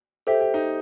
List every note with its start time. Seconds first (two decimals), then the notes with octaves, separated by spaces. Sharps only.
0.27 G4 A4 C5 E5
0.41 G4
0.54 D#4